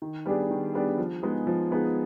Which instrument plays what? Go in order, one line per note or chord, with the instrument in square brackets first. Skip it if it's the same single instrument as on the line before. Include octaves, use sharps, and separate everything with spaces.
[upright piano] D#3
G3 B3 D4 G#4
D#3
G3 B3 D4 G#4
F3
G#3 B3 D#4 G#4
F3
G#3 B3 D#4 G#4